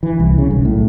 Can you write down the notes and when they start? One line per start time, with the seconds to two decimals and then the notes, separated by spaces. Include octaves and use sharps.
0.03 E3
0.20 C2
0.38 C#3
0.50 B1
0.65 A2